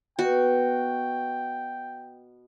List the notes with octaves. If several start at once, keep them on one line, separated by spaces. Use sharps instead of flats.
B2 F#4 G5